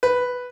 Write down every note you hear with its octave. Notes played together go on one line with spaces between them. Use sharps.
B4